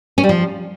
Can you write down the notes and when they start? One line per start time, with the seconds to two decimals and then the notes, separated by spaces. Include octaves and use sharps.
0.18 C#4
0.23 G3
0.29 F3